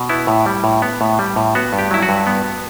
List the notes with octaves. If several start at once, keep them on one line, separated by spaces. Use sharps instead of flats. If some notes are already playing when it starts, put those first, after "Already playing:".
Already playing: B2
B3 E4
A2
G3
A2
B3
A2
G3
A2
B3 F#4
G2
G4
F#3 E4
F#4
G2
B3